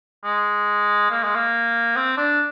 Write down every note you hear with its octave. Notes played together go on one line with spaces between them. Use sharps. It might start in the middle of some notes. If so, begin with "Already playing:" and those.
G#3
A#3
G#3
A#3
C4
D4